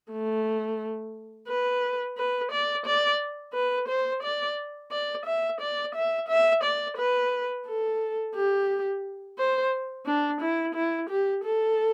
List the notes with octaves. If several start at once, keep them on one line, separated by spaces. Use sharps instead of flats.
A3
B4
B4
D5
D5
B4
C5
D5
D5
E5
D5
E5
E5
D5
B4
A4
G4
C5
D4
E4
E4
G4
A4